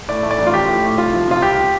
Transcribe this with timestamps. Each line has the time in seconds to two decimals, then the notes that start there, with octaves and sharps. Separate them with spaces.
0.08 A2 D5
0.23 A3
0.31 D5
0.38 A1
0.47 F4
0.53 F3 G4
0.68 A2
0.84 A3
0.98 C2 F4
1.13 F3
1.28 C3 F4
1.42 C2 G4